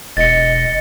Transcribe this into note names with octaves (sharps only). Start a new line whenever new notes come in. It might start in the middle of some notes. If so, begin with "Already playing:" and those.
E1 D#5 A6 C#7